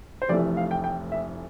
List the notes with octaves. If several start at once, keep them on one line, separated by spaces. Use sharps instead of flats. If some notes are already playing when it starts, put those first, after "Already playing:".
C5
F1 F2 E3 A3 D5
F5
G5
G5
E5